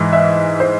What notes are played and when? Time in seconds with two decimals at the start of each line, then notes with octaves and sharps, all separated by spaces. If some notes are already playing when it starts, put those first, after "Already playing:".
Already playing: G#2 E3
0.13 E5
0.60 C5